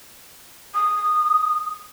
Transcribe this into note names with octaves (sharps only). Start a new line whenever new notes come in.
D#6